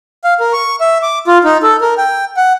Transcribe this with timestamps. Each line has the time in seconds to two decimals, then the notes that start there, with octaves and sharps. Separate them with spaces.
0.24 F5
0.40 A#4
0.53 C#6
0.81 E5
1.02 D6
1.27 F4
1.44 D#4
1.63 A4
1.81 A#4
1.98 G5
2.37 F#5